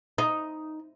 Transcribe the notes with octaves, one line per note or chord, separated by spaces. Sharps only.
D#4